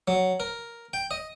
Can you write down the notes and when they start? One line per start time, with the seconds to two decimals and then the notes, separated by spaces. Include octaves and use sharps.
0.08 F#3
0.40 A#4
0.93 G5
1.11 D#5